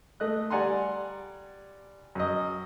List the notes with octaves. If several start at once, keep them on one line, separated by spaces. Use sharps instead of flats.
A3 D#5 F#6
G3 D5 F#5 G#5 A#5 C6
F#2 D#5